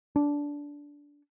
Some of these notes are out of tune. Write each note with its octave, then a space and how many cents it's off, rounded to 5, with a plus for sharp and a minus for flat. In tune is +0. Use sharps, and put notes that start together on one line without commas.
D4 -15